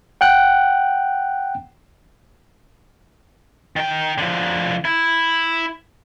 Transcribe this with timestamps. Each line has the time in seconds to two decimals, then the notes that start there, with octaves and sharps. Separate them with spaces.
0.21 F#5 G5 F#6
3.76 D#3 G5
4.18 D3 F3
4.85 E4